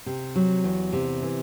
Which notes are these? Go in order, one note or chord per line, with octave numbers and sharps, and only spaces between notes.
C3
F#3
E2
C3
E3